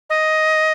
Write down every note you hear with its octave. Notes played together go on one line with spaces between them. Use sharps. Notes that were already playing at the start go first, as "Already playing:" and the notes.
D#5